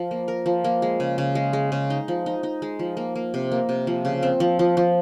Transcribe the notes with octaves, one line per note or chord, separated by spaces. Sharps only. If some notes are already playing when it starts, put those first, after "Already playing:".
Already playing: F3
A#3
A#4
F3
A#3
G#3
C#3
C#3
G#3
G#3
C#3
D#4
F3
D#4
D#4
G#3
F3
A#3
A#3
C3
A#3
C3
F3
C#3
C4
F3
F3
F3